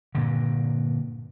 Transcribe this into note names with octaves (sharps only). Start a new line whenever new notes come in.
G2 A#2 D3